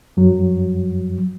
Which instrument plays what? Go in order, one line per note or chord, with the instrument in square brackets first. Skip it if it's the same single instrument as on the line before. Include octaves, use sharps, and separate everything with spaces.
[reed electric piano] F#2 F#3